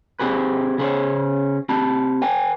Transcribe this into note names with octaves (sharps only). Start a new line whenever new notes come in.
C4 G4 G#4 B4
C#3 G#4 C5 C#5
C4 G4 A5 B5
B4 G5 G#5